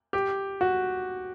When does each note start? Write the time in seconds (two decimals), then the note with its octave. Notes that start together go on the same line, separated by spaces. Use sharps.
0.13 G4
0.61 F#4